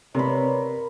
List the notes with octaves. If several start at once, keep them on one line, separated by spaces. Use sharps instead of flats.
C3 A#4 B4 C#5 D5 B5